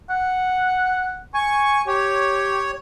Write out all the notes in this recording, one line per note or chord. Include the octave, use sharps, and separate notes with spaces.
F#5
G#5 C#6
G4 C#5